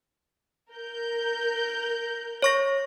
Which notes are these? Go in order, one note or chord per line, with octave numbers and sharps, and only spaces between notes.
A#4 G6
C#5 C#6 A#6